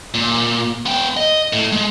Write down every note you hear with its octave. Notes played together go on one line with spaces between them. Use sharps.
A#2
B3 G5
D#5
A2
G#3